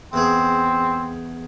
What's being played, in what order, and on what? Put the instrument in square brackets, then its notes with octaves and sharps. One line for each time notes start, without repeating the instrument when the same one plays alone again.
[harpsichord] E2 G#4 [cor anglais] C4